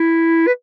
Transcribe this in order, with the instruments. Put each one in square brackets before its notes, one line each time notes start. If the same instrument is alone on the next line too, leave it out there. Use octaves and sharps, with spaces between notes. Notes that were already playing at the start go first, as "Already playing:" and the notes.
Already playing: [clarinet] E4
B4